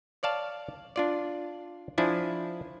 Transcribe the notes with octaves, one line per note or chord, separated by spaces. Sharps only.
C#5 D5 F5 A5
D4 F4 D5
F3 D4 E4 G#5